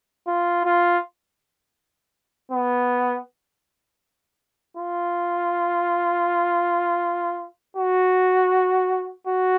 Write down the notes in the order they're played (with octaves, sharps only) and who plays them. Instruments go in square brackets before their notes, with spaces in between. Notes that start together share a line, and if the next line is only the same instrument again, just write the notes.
[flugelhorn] F4
F4
B3
F4
F#4
F#4